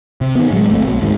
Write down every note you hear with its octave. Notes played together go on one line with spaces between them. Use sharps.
C3
D#3 B3
A2 F#3 G#3
D1 G1 A3 C4
B1 F#3
G#1 D#2 G#2